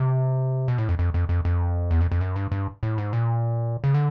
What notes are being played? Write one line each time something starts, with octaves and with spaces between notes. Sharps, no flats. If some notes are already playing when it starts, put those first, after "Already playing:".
Already playing: C3
B2
A2
F2
F2
F2
F2
F2
E2
F2
F2
F#2
G2
G2
A2
G#2
A#2
C#3
D3